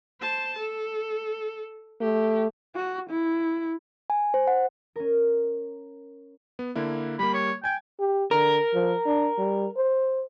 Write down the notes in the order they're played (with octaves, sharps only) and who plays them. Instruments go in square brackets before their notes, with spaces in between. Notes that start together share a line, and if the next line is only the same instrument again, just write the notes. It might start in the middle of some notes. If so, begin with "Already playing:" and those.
[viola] C5 A5
A4
[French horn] A3 [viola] G4
[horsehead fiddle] F#4
E4
[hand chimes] G#5
C5
F#5
[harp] C#4 A#4
[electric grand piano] B3
D3 A#3 E4
[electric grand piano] G3 A#3 [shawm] B5
[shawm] C#5
[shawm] G5 [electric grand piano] G#5 G#6
[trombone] G4
[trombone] D3 [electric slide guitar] A#4
[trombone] F3
D4
G3
C5